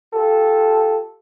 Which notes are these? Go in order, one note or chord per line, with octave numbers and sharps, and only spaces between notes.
F4 G4 A4